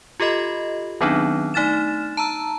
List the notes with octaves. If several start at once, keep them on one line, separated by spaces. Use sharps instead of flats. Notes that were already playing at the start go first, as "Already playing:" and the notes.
F4 G4 A4 D#5 B5
D#3 F#3 B3 C4 D4 D#4
A3 D#4 F6 A6 E7
A5 A#5 E6